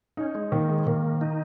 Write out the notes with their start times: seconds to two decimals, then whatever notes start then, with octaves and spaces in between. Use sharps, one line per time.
0.17 C#4 D#4
0.35 G#3
0.52 D#3 A#3
0.70 G#3
0.87 D#3 A#3
1.21 D#4